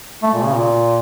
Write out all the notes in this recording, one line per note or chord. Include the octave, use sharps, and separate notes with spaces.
A3
A#2
C#3
A#2